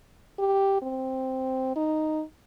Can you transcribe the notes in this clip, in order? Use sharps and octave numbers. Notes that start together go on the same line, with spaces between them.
G4
C4
D#4